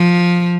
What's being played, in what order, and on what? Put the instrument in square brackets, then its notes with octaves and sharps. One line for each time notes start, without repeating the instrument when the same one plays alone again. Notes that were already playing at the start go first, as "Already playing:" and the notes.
Already playing: [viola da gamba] F3